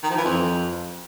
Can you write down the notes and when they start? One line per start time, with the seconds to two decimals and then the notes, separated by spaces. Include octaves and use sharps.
0.03 D#3
0.10 F3
0.18 E3
0.25 F2